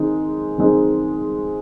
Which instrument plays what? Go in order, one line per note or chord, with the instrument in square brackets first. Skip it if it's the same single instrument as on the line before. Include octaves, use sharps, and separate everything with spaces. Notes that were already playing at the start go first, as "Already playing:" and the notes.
Already playing: [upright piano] D#3 G#3 C4 D#4
D#3 G#3 C4 D#4